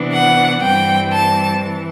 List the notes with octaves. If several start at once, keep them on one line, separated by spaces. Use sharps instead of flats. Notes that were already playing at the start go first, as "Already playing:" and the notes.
Already playing: C3 E3 B3 D4
F#5
G2 E3 G3 C4 G5
A5
E3